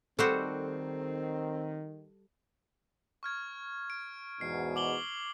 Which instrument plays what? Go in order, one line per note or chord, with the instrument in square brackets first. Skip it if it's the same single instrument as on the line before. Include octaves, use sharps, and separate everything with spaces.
[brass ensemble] D#3 [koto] G3 F#4 C5 [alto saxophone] C4 [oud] A4
[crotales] C#6 F6 G#6
D7
[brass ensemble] E2 G#2 B2 [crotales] C7
[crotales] D6 F#7 G7